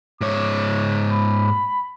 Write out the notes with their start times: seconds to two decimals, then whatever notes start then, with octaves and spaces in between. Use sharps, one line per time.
0.21 G#2 C#5 D6
1.13 B5